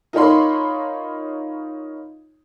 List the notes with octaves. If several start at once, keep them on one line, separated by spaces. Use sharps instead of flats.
D#4 F4 A#4 C#5 B5 C6